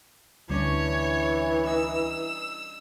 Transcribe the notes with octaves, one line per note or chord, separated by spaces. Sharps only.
D2 E3 G3 C#4 D4 C#5
D#4 E6